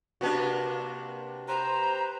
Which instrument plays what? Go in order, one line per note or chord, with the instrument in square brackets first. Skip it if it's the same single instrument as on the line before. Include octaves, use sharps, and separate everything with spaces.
[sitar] C3 A#3 D4 [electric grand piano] F#4 B4 A5
[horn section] G4 B4 C5 [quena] A#5